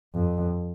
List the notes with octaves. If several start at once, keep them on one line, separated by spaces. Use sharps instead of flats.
F2